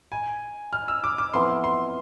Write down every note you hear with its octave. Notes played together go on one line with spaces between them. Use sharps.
G#5
F6
E6
D6
D6
F2 E3 B3 C6
C6